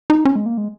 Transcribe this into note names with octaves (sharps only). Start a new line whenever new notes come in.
D#4
C#4
G#3
A#3
G#3